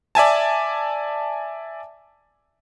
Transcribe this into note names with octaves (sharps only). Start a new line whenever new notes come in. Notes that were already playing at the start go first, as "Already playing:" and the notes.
D5 E5 G#5 A5